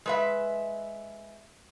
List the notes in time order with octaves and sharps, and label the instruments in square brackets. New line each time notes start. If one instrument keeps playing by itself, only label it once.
[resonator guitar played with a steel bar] G#3 B4 E5